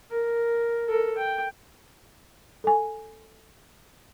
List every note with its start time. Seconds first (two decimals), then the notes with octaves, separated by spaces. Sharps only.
0.11 A#4
0.88 A4 A#4
1.17 G5
2.64 A4 G#5